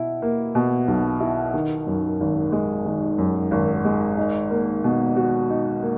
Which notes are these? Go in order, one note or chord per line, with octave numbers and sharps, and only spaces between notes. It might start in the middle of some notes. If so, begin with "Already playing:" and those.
Already playing: B2 E4
A#3
B2
B1
E4
D#3
F#2
G#1
G#3
D#3
F#2
G#1
G#3
D#4
A#3
B2
F#4
D#4
A#3